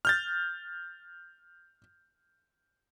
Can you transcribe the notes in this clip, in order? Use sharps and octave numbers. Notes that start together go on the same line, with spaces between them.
F6 G6 A6